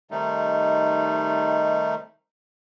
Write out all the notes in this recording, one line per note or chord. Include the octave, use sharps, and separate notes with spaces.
C3 D#3 G3 A3 D#4